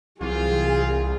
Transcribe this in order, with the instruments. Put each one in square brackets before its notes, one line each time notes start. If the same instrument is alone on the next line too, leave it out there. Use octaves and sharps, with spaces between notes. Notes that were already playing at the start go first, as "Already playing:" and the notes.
[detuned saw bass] C2 [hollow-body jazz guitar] E3 F#3 [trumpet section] C4 F4 [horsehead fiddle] G#4